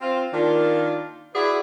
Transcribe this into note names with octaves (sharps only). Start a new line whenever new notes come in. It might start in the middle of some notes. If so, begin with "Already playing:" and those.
C4 F4
D#3 A#3 D4 F4
E4 F#4 G#4 B4 D5